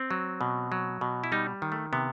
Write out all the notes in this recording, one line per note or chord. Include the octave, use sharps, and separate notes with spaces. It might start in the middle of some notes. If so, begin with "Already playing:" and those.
Already playing: C4
F#3
B2
F#3
B2
E4
G3 D#4
D#3
A3
C3 B3